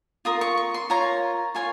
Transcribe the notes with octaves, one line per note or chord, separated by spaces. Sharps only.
F4 A#4 D#6
C#6
C#6
C6
F4 A#4 C#5 A#5
F4 A#4 C#5 G#5